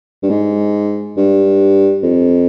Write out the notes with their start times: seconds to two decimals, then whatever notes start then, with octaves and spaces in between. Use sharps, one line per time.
0.23 G2
0.30 G#2
1.17 G2
2.03 F2